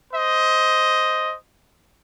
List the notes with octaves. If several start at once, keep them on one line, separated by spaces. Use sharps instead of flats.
C5 D#5